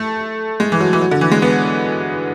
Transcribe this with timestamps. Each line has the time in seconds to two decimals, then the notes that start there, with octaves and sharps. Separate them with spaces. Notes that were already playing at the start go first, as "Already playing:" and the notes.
Already playing: A3
0.60 G#3
0.72 E3
0.80 F#3
0.93 E3
1.01 F#3
1.11 D3
1.21 E3
1.31 G#3
1.42 B3